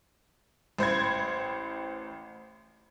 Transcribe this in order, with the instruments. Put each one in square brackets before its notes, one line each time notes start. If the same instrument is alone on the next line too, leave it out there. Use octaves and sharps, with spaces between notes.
[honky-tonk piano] A1 C5 B5 G#6